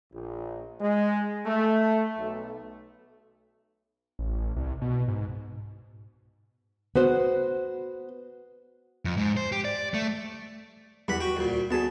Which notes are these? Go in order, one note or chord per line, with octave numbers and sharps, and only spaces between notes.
A#1
G#3
A3
B1
A1
C2
B2
G#2
B3 F#4 C5
F2
G#2
C5
G4
D5
A3
E2 G3 F#5 B5
F#4 G5
D2 A#2
D2 B3 G#4 A5